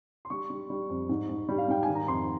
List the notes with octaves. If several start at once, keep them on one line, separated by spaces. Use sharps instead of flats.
C6
G3 C#6
G3
G3
F2
G#2
G#2
G3
F5
G#2 G5
D#3 G#5
A#5
F2 C6